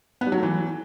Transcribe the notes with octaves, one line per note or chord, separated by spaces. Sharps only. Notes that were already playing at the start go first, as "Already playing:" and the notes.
B3
G3
F#3
A3
E3